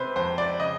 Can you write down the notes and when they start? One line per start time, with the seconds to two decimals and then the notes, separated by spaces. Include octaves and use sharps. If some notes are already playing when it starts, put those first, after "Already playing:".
Already playing: C3 B4 C5
0.16 F2 C5
0.38 D5
0.59 C#3 D#5